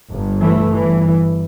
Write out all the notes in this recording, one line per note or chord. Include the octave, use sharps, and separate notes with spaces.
G1 G2
E3 A3
G1 G2 E3